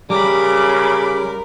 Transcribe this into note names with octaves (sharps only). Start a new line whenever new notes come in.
C#3 G3 A#4 B5 D6